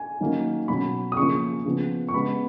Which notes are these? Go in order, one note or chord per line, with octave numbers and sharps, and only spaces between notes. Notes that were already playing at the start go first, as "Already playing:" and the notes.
Already playing: G#5
D#3 F#3 A#3 C#4
B2 F#3 C#4 B5
D#6
C#3 F3 A#3 C#4 C#6
C#3 F3 B3
C#6
C#3 G#3 B3 B5